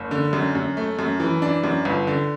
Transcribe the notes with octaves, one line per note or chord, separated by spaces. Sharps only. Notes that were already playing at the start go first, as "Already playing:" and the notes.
Already playing: F#1
D3
F#2
F#2
A3
F#2
E3
D4
F#2
G1
D3